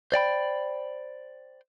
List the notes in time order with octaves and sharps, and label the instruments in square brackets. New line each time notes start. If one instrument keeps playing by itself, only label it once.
[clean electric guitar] C5 D5 G5 B5